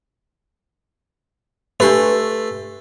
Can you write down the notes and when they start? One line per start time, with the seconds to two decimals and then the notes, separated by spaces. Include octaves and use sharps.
1.80 A3 D4 G4 B4 C6 E6